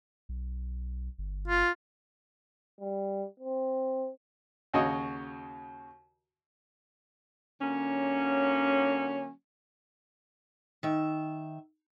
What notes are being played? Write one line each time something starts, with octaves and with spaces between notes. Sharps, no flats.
B1
G1
F4
G3
C4
D#2 C#3 F#4 C#5 D#5
D3 F#3 A#3 C#4
D#3 E5